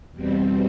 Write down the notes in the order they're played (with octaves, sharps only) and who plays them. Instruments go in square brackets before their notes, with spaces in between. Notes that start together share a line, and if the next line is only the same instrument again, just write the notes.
[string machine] E2 B2 G3 C4